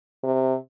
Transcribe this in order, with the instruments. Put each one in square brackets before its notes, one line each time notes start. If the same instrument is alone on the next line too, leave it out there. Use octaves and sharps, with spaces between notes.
[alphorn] C3